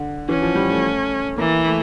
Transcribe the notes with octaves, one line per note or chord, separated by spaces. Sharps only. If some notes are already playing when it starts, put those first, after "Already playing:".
Already playing: D3
E3 C#4
F3
G3
A3
E3 A#3
A3